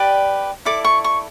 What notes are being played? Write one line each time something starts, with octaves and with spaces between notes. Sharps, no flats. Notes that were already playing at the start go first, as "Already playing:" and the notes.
Already playing: G4 B4 D5
E4 A4 D5 D6
C#6
C#6